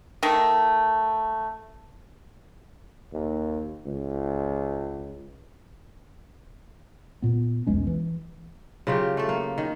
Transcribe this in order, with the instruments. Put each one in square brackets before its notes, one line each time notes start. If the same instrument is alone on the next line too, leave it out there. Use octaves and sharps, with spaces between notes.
[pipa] D#3 A3
[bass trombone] D#2
C#2
[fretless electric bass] A#2 B3
B1 E2 G#3 C#4
E3
[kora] C#3 F#3 F4 G4
A3 A4
A#3
D#3